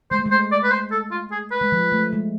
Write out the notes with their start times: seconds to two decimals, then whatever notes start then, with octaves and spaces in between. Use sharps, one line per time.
0.11 G#3 C5
0.19 A3
0.26 G#3
0.31 C5
0.52 D5
0.63 B4
0.71 C5
0.92 A4
1.11 F4
1.32 G#4
1.51 B4
1.61 G#3
1.72 F3
1.92 A3
2.13 G#3